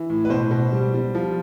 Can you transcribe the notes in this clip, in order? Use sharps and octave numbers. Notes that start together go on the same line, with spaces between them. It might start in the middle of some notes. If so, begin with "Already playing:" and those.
Already playing: E3
A2
B4
B2 C5
B2
G3
G3
F3